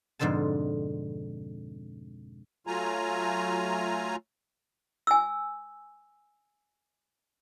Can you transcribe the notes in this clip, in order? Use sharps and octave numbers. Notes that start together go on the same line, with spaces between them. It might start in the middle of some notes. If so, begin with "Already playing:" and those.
F2 G#2 B2 D3 C5 A5
F#3 A3 F4 G#5 A#5
G#5 E6